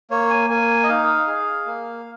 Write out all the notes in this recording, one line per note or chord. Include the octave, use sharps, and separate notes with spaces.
A#3 C#5
G#5
A#3 G#5
D#5
D#4 F5
G#4
A#3